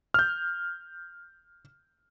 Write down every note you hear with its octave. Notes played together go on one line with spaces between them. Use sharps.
F6 G6